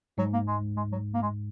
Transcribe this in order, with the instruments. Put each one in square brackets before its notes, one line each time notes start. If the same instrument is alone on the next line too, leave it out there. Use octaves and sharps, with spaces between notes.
[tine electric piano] G#2 [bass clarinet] F#3
[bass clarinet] A#3
G#3
G#3
F#3
A#3
G#3